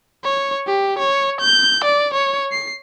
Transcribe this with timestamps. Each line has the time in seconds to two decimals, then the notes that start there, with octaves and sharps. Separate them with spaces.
0.24 C#5
0.67 G4
0.99 C#5
1.40 G6
1.84 D5
2.14 C#5
2.52 C7